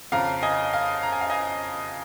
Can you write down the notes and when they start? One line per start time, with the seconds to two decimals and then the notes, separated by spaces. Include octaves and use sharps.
0.12 F2 C#3 F5 A#5
0.43 D#5 G#5
0.73 F5
1.02 A#5
1.12 G#5
1.21 F5
1.30 D#5 G#5